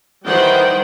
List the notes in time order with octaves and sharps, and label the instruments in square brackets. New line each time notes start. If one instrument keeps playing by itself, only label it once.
[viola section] D#3 E3 G3 C5 F#5 G5